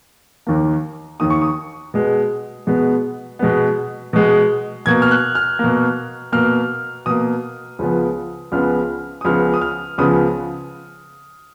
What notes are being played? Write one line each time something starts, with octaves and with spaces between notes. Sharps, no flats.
D#2 D#3 A#3
D#2 D#3 A#3 D#6
C#6
D#6
B2 G#3 B3
B2 G#3 B3
B2 G#3 B3
B2 G#3 B3
B2 A#3 G#6
F6
F#6
F6
B2 A#3
B2 A#3 F6
B2 A#3 D#6
C#2 C#3 F3 B3
C#2 C#3 F3 B3 F6
D#6
C#2 C#3 F3 B3 F6
D#6
F6
C#2 C#3 F3 B3 D#6